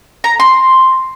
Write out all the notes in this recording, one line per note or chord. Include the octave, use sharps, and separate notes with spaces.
A#5
C6